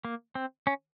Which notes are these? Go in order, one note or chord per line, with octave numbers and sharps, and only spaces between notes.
A#3
C4
C#4